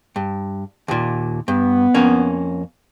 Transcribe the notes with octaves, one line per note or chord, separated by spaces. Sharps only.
G2
D#2 A#2
G2 B3
F2 A#3 C#4